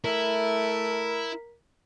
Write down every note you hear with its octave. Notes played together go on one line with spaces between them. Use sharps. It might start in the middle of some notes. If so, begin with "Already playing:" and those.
A3 E4 A#4